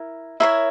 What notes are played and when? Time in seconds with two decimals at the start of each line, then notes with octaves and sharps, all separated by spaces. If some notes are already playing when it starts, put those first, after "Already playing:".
Already playing: E4 A#4
0.40 E4 A#4 C#5 E5